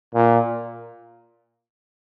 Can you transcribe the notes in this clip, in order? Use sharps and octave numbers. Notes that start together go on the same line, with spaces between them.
A#2